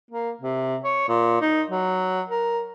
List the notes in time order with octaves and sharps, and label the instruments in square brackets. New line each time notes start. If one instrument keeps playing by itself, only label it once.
[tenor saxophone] A#3
C3
C#5
A#2
D#4
F#3
A#4